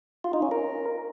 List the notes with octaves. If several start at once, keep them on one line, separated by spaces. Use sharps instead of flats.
F4
D#4
C#4
A#4